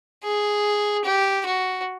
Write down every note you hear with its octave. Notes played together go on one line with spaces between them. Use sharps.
G#4
G4
F#4